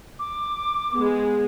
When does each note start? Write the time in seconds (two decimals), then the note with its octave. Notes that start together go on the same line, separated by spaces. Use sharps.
0.19 D6
0.91 G#3 B3